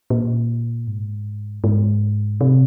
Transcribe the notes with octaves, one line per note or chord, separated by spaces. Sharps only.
A#2
G#2
G#2
C3